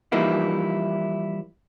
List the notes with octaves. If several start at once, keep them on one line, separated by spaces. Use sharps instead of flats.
E3 F3 G3 A#3 D#4 E4